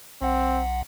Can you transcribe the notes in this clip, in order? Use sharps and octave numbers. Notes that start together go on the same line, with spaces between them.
B1 C4 F#5